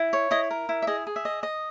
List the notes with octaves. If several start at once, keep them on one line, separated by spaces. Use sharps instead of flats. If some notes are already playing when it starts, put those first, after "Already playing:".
Already playing: E4
C#5
E4 D#5
A#4
E4
E5
G#4 D#5
G#4
E5
D#5
D#5